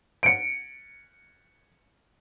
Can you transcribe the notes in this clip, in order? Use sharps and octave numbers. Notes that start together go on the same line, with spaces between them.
C#7 D7